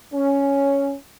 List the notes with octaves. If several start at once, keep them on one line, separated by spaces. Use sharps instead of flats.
C#4